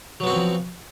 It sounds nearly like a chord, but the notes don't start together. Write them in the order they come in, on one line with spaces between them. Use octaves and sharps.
F#3 B3 F#4 C4 F3